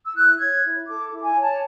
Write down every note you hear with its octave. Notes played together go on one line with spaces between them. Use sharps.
E6
E4 F#6
C#5 G#6
E4
A4 D6
E4
G#5
C#5
A5